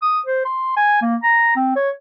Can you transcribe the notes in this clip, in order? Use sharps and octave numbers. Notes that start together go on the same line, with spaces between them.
D#6
C5
C6
G#5
A#3
A#5
C4
C#5